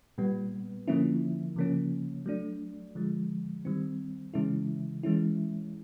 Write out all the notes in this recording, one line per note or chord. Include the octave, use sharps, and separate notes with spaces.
A#2 G3 B3
D3 F3 A#3 C#4 E4
C#3 F3 A#3 C#4
F#3 A3 D4
D3 F3 G#3
D#3 G3 C4
C#3 E3 G#3 C#4 E4
E3 G#3 C#4 E4